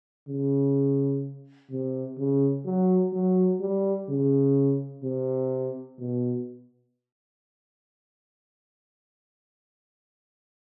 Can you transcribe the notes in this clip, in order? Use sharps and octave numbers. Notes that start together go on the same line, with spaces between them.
C#3
C3
C#3
F#3
F#3
G3
C#3
C3
B2